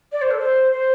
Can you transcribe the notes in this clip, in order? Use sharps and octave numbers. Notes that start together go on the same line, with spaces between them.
D5
C5
A4
C5
C5